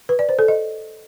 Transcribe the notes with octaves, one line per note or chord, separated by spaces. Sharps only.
B4
D5
C5
A4
D#5